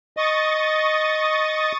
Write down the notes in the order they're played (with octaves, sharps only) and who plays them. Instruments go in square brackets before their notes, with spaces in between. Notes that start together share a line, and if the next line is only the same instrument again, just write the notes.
[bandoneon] D#5 [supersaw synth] C#6 D#6 A6